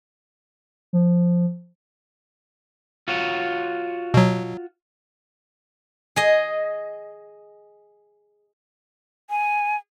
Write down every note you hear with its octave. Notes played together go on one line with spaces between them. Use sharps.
F3
F4 F#4 C#5
B2 F#3
G#4 D#5
G#5